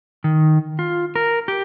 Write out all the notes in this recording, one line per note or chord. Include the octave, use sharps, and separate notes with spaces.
D#3
F4
A#4
G4